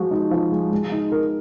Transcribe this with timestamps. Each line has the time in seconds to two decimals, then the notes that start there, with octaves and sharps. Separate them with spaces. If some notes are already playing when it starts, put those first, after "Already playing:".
Already playing: F3 G#3 F#4
0.11 D#4
0.31 F3
0.52 G#3
0.72 G#3
0.92 D#4
1.12 A#4